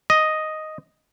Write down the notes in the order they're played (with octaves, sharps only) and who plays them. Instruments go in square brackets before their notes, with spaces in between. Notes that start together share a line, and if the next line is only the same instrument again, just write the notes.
[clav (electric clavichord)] D#5